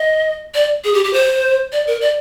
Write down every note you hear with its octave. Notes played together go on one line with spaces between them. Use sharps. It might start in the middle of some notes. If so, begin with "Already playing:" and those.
Already playing: D#5
D5
G#4
G4
G4
C5
D5
A#4
D5